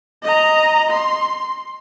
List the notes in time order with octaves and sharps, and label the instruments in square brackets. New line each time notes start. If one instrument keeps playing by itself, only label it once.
[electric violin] D#5 A#5
C6